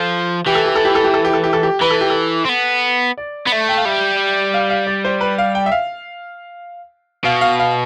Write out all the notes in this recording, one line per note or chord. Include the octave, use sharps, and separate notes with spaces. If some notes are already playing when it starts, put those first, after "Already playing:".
Already playing: F3 A4
E3 G4
A4
G4
A4
G4
A4
G4
A4
G4
A4
G4
A4
G4
E3 B4
A4
G4
A4
C4
B3
D5
B3
A3
G5
F5
G3 E5
F5
F5
D5
C5
B4
F5
G5
E5
F5
B2 F5
F5
F5